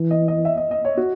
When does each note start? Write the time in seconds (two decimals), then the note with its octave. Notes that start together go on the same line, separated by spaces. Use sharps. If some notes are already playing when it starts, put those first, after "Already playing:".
Already playing: E3
0.11 D#5
0.28 D#5
0.45 E5
0.57 D#5
0.71 D#5
0.85 C#5
0.97 F#4